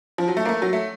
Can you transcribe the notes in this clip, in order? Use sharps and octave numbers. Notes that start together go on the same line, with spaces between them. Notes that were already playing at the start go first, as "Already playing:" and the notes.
F3
F#3
A3
A#3
A3
F#3
A3